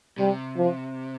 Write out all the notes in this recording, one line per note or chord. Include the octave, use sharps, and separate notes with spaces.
C3 G3
F3